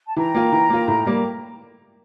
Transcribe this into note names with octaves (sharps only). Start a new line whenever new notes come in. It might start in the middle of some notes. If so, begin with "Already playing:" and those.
A5
E3 G5 A#5
A#3 F4
E3
A#3 F4
A2
G3 A#3